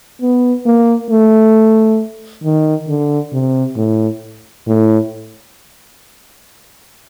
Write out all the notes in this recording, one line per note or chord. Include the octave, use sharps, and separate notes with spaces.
B3
A#3
A3
D#3
D3
C3
A2
A2